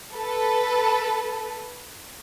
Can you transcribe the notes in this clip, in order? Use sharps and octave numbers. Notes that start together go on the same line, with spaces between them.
A4 B4